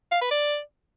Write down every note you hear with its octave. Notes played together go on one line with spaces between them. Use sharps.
F5
B4
D5